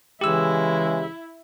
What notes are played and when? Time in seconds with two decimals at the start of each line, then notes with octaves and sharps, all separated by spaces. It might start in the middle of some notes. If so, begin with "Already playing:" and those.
0.21 C#3 E3 G#3 E4 G4 E6